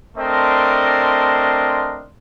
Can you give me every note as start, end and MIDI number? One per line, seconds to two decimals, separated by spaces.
0.18 2.04 57
0.18 2.04 60
0.18 2.04 62
0.18 2.04 70
0.18 2.04 75
0.18 2.04 84